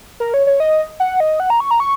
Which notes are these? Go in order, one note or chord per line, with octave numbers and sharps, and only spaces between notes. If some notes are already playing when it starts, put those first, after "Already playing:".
A#4
C#5
C#5
D#5
F#5
D#5
F#5
A#5
C#6
A#5
C#6